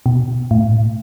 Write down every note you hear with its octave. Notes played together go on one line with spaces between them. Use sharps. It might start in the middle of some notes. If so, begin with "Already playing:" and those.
B2
A2